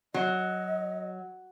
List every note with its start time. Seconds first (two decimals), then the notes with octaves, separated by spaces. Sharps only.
0.14 F#3 D#5